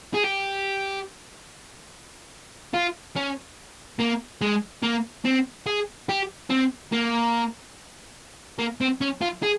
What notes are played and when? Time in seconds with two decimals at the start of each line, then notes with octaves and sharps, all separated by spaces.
0.14 G#4
0.23 G4
2.74 F4
3.16 C#4
4.00 A#3
4.41 G#3
4.83 A#3
5.25 C4
5.66 G#4
6.09 G4
6.50 C4
6.92 A#3
8.59 A#3
8.81 C4
9.01 C#4
9.22 F4
9.43 G#4